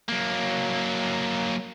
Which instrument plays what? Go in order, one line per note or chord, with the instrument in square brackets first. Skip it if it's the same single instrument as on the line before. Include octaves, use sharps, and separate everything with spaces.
[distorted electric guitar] F#3 A#3